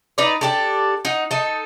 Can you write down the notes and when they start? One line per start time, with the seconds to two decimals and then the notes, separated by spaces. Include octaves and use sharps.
0.18 D#4 B4 D5
0.41 D4 G4 A4
1.05 D#4 F#5
1.31 D#4 A4